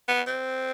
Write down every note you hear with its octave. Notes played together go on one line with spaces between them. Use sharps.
B3
C4